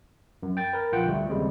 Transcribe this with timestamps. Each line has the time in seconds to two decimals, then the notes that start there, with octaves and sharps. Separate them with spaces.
0.43 F#2
0.57 G5 A6
0.73 A#4 B4
0.92 A#1 F4 F#5 G5
1.06 D2 D3 G3 A3
1.29 D#2 C#3 G3 G#3 C4